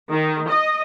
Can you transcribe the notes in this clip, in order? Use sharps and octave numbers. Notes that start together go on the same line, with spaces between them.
D#3
D#5